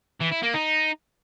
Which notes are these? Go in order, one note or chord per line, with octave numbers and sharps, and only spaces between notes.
E3
E4
A#3
D#4